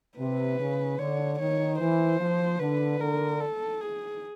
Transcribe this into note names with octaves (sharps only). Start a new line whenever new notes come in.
C3 B4
C#3
D3 C#5
D#3 C#5
E3 C5
F3
D3 B4
D3 A#4
A4
G#4